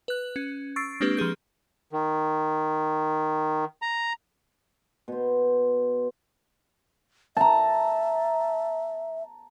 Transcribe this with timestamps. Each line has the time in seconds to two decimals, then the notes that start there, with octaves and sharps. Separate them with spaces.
0.08 B4 F#6
0.36 C#4
0.76 C#6 E6 A6 C7 D7
1.01 G#3 A#3 C4 D4 G4 B4
1.17 F3 G4 G#4 G6
1.92 D#3
3.82 A#5
5.08 B2 C5
7.37 E5 A5 A#5